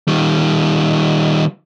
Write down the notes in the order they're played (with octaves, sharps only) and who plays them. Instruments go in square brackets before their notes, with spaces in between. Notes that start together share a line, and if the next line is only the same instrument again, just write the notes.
[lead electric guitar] D#3 G3